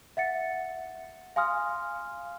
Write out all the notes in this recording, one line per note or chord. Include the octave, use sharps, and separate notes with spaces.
E5 F#5 A6 C#7
F5 G#5 C6 D#6 F6